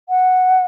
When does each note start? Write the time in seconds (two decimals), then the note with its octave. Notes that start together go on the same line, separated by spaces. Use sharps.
0.09 F#5